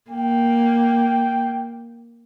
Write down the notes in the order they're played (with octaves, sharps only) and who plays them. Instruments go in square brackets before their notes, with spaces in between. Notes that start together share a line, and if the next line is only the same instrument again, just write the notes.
[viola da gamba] A#3 [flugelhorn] G5